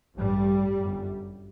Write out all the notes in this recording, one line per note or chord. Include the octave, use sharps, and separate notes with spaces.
A1 G2 G3
G1 F#2